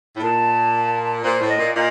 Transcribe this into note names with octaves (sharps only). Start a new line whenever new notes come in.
A2
A#2 A5
A#2 C5
A2
D#5
A#2
A#2 D#5